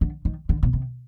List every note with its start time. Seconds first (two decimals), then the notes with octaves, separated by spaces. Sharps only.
0.01 D3
0.25 D#3
0.49 D3
0.63 B2
0.73 C3